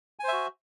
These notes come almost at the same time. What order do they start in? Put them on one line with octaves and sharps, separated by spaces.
G#5 C5 E5 F#4